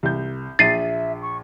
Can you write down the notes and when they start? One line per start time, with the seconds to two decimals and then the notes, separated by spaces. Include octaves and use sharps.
0.03 C2 G6
0.59 A#1 E5 A6 C7 D#7
1.22 C#6